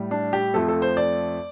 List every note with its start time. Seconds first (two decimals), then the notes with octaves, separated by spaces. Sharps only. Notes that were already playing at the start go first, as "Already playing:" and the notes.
Already playing: A2 G3
0.11 D4
0.33 G4
0.54 F2 F3 A3 A4
0.68 A4
0.82 C5
0.97 D5